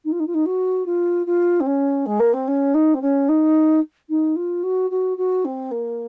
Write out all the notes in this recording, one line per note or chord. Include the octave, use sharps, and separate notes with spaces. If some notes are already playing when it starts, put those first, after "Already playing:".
D#4
F4
D#4
F4
D#4
F#4
F4
F4
C4
C#4
G#3
A#3
C4
C#4
D#4
C4
C#4
D#4
D#4
F4
F#4
F#4
F#4
C4
A#3